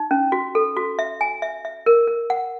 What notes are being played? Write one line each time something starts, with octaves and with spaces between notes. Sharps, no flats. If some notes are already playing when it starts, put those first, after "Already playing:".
Already playing: D#4
C#4
F#4
A4
F#4
E5
G#5
E5
E5
A#4
A#4
F#5